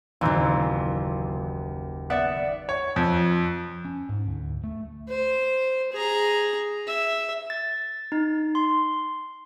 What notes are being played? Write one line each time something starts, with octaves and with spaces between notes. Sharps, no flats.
F#1 D#2 A#2 E3 C4
B3 D5 E5 F#5
C#5
F2
C#4
G#2
D2
A3
C5
G#4 A#5
E5
A6
D#4
C6